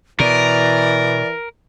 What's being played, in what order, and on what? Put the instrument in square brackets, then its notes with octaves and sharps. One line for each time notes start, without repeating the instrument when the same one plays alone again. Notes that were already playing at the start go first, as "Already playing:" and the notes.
[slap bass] B2 [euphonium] E3 [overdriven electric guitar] A#4 [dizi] D5